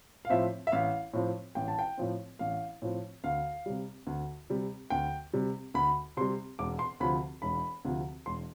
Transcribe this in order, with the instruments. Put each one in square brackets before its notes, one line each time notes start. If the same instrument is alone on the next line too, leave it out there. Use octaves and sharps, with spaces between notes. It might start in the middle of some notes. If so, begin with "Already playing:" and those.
[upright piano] F5
A2 F3 C4 E5
E5
A1 F5
A2 F3 C4
A1 G5
A5
G5
A2 F3 C4
A1 F5
A2 F3 C4
D2 F5
C3 G3
D2
C3 G3
D2 G5
C3 G3
D2 B5
C3 G3 C6
E1 D6
C6
D2 C3 F3 B5
E1 B5
D2 C3 F3
E1 C6